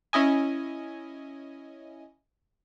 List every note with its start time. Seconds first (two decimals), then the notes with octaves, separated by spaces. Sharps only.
0.13 C#4 E4 D#5 G#5